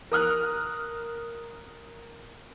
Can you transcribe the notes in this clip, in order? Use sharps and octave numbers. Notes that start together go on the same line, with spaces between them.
A#4 D#6 F6 F#6